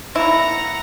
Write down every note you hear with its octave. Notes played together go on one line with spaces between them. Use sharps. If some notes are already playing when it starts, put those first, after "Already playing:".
A#3 E4 F#5 A#5